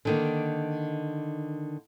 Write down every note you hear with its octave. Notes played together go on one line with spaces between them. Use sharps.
D3 D#3 A#3